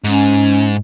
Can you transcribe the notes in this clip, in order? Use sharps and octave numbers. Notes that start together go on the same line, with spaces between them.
G#2 C#4